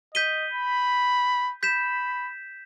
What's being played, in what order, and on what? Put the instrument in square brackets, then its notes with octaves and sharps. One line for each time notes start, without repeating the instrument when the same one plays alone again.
[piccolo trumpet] D#5 [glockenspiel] G6 B6 D#7 G7
[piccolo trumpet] B5
[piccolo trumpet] B5 [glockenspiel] G6 B6 E7